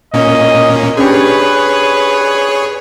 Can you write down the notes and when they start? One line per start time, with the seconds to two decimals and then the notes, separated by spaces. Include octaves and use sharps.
0.14 A#2 A#3 C#4 D#5
0.97 C#4 D4 G4 G#4 B4 C#5